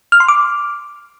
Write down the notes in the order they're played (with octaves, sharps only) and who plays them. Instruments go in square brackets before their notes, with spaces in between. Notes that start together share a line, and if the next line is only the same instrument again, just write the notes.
[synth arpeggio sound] F6
C6
D6